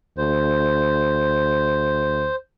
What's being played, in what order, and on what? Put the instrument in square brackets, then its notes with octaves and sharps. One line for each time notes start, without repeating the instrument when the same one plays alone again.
[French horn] D2 [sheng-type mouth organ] C5